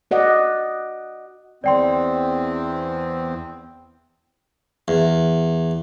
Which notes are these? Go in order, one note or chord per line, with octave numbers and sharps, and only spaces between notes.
F#4 D5 D#5 F#5
E2 C4 D5 G5 C6
E2